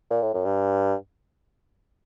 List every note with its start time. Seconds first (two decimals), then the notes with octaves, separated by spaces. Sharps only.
0.10 A#2
0.22 A2
0.34 F#2
0.45 G2